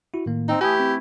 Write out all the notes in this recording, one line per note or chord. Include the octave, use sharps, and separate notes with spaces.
E4 F#4
A2 D#3 A#3
C4 D#4
E3 A3 E4 G4 G#5 A5 D#6
C4